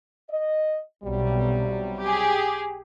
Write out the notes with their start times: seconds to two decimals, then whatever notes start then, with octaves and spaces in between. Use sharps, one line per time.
0.29 D#5
1.04 B1 C3 F#3 G3
2.00 G4 G#4